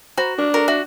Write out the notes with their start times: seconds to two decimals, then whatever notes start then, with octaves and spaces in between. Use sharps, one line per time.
0.17 F#4 C5 A#5 B5
0.38 D4 A#4
0.54 F#4 A4 A#4
0.68 F#4 E5